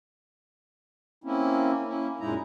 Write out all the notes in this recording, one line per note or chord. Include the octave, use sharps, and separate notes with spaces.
A#3 C4 C#4 E4
A#3 C#4 E4
F#2 A#2 G#3 D#4 E4 A#5